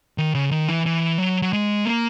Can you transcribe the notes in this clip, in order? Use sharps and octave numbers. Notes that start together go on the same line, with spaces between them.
D#3
C#3
D#3
E3
E3
F#3
F#3
G#3
A#3